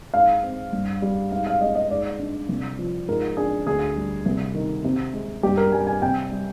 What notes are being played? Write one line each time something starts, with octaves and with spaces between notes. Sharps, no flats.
G#2 F5
C4
G2
G3
G#2 F5
F5
G#3 D#5
D#5
G#2 D5
D4
C2
F3
G#2 A#4
D4 G#4
D2 G#4
G3
C2
D#3
C3
G#3
G2 G4
A#4
G3 G#5
G#5
C3 G5
G3